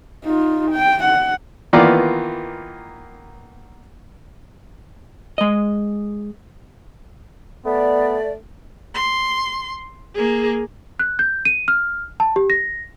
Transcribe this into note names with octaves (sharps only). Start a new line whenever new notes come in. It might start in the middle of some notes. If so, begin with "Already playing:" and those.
D#4 F4
G5
F#5
D#3 E3 A#3 B3 F4 D5
G#3 D#5
A3 B3 D5
C6
A#3 G#4
F#6
G6
D#7
F6
A5
G4
A#6